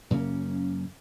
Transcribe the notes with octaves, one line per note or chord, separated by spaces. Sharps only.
F#2 C#3 A#3 C#4